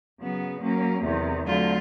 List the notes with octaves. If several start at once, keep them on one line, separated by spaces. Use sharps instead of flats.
C#3 F#3 B3
F#3 A#3 C#4
E2 C3 D#3
D3 F#3 A3 C4 F4